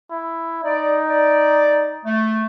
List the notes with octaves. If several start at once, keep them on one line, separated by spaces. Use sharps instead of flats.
E4
D#4 D5
D5
A3